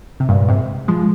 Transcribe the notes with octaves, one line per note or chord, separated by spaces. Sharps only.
C3
G2 A#2
G#2 C3
F3 G#3